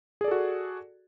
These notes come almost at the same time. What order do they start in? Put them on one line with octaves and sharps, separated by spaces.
G#4 D5 A4 F#4